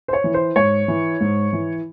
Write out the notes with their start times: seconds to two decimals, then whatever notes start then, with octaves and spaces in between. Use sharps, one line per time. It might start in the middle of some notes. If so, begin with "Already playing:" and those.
0.08 C5
0.13 C#5
0.24 E3
0.34 C5
0.56 G#2 C#5
0.88 E3
1.21 G#2
1.53 E3